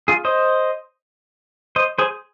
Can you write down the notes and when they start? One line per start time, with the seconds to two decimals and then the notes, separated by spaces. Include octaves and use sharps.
0.08 F4 G#4
0.25 C5 D#5
1.76 C5 D#5
1.98 G#4 C5